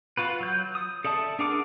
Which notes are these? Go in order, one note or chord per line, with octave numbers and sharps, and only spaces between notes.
F4 F#4 B4
F#3 G6
D#6
A4 D5 E5 A5
D4 G#4 A#4 F#5 D6